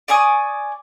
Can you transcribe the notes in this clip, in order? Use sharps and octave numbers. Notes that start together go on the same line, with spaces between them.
D5 G#5 C#6 D#6